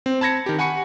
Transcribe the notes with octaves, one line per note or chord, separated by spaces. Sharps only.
C4
A5 B5 G#6 A#6 C#7
D#3 G4
F#5 G#5 B5 C#6 C#7